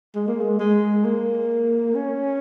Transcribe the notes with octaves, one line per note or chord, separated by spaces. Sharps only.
G#3
A#3
G#3
G#3
A#3
C#4